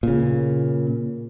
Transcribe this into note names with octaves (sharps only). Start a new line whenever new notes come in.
A#2 C#3